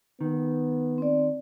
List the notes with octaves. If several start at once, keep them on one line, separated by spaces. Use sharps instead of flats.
D#3 B3
C4 D5